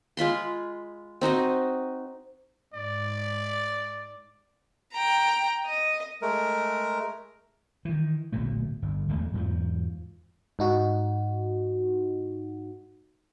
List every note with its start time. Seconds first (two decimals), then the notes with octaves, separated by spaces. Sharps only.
0.17 G#3 F4 B5 C6
1.21 C4 D#4 F#4 D#5
2.74 G#2 D5
4.93 G5 A#5
5.67 D#5
6.22 G#3 A3 A#4
7.85 D#3 E3
8.32 D1 A#1 B2 A3
8.82 G1
9.08 D1 E2 G#3 A3
9.33 E2 G#2 F3
10.59 G#2 D#4 F#4